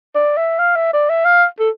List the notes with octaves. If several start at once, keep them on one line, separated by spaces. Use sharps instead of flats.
D5
E5
F5
E5
D5
E5
F5
A4